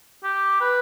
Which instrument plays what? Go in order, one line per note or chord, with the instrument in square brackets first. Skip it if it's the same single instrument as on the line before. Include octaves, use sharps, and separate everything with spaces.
[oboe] G4
B4